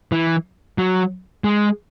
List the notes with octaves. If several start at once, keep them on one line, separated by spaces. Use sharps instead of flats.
E3
F#3
G#3